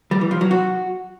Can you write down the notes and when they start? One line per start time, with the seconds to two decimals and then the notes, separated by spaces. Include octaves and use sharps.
0.11 G3
0.21 E3
0.31 F3
0.41 F#3
0.51 F#4